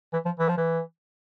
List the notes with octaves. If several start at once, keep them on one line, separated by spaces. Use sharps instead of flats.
E3
F3
E3
F3
E3